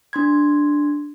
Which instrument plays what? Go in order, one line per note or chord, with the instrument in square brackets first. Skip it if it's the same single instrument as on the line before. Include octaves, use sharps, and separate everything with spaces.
[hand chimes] D4 C6 G#6